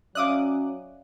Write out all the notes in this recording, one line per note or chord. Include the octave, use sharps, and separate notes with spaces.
F#3 C#4 D5 E5 F5 D6 D#6 F#6